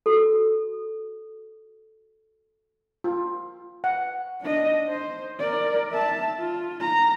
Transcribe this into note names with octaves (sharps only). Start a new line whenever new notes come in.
F#4 A4
F4
F#5
D4 D#5
C5
A#4 D5
E5 A5
F4
A#5